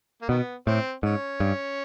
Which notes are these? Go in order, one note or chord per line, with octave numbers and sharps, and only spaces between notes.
A#3
B2 D#3 B3
A2 C4
G#2 C#4
G2